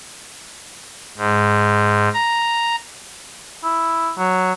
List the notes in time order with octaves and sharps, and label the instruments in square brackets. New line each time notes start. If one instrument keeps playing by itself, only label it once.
[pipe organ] G#2
A#5
[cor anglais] E4
F#3